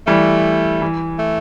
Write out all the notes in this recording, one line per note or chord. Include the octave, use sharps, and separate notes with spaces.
E3 G3 A3
E3
A3